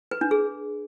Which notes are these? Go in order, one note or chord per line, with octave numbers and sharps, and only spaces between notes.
B4
D4
G#4